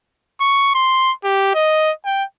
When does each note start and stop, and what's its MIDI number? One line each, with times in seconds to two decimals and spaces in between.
0.41 0.70 85
0.75 1.12 84
1.24 1.53 67
1.55 1.92 75
2.05 2.24 79